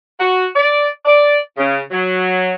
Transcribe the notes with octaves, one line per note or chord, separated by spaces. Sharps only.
F#4
D5
D5
C#3
F#3